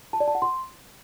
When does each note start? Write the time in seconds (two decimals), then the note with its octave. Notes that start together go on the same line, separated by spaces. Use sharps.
0.13 A5
0.20 D5
0.28 A5
0.35 F#5
0.42 C6